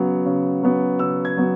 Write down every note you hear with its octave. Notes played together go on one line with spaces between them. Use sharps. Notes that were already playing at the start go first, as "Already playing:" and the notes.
Already playing: C#3 F#3 B3
C#3
F#3 B3
C#3 E6
G#6
F#3 B3